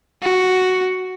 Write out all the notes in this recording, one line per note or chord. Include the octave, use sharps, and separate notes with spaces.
F#4